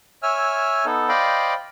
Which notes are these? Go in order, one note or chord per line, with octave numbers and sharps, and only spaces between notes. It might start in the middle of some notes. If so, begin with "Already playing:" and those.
C#5 E5 G#5 E6 F6
B3 D#4 A4
C5 D5 D#5 F5 G5 B5